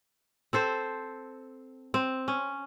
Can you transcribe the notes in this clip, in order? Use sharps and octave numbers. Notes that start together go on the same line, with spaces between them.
C4 A4 C5
C4
C#4